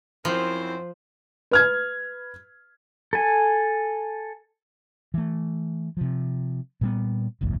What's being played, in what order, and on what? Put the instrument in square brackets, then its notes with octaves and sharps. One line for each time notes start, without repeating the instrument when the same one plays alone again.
[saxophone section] F#2 C4 [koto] F3 [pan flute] E4 [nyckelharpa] C5
[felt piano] B4 F6 G#6
[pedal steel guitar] A4 G#5
[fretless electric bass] E3 A3
C3 F3
A#2 G3 B3
F#1 B1 E2 A2